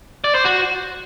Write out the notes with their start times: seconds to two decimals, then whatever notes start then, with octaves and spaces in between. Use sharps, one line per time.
0.24 D5
0.35 C5
0.45 F#4